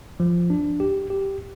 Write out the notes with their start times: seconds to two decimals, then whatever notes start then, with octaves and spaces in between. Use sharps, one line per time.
0.20 F3
0.50 D4
0.80 G4
1.10 G4